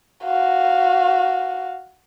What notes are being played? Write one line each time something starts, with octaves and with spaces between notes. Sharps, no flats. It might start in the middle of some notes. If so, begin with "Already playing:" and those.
F#4 F5